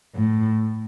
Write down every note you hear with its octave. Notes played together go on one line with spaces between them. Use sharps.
A2